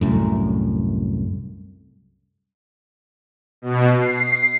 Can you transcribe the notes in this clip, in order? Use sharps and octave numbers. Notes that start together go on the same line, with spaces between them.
C2 F#2 A2
B2
C7